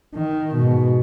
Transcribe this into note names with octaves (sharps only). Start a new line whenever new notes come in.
D#3
G#2 B2